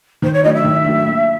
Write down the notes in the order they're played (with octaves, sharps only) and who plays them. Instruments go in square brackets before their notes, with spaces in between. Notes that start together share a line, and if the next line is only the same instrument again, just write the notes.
[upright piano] D#3 [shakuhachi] C5
[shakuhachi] C#5
[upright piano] F#3 A3 D4 [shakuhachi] D#5
[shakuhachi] E5
[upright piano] D#3
F#3 A3 D4
A#2